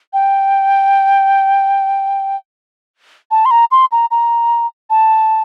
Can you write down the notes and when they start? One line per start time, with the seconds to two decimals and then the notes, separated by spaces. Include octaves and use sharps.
0.13 G5
3.31 A5
3.45 C6
3.51 A#5
3.71 C6
3.92 A#5
4.11 A#5
4.90 A5